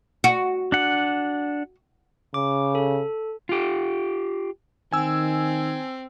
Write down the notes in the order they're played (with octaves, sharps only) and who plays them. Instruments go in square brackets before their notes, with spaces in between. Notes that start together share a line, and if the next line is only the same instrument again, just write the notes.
[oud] F#4
[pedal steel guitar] D4 F#5
[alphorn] C#3 [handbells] D6
[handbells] A4
[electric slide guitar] F4 G4
[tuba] D#3 [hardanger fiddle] C4 [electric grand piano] G#5 E6